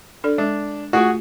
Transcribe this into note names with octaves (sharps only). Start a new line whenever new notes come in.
D4 A4 D5
G#3 D4
A3 F4 F#4 G#4